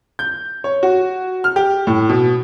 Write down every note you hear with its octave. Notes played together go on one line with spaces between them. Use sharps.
G6
C#5
F#4
F6
G4
A2
B2